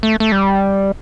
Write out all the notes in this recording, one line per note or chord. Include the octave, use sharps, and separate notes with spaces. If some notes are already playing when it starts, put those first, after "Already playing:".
A3
A3
G3